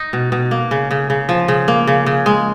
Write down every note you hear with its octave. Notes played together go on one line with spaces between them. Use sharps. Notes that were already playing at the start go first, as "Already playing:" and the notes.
Already playing: D#4
B2
B2
A#3
C#3
C#3
C#3
F3
C#3
A#3
C#3
C#3
G#3